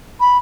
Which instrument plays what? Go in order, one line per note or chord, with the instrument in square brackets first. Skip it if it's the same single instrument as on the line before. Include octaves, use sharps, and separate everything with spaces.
[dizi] B5